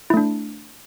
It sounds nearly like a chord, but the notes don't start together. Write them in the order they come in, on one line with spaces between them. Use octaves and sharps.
E4 A3 D4